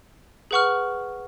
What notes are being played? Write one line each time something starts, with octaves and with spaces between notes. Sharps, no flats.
G#4 B4 F#5 C#6 F6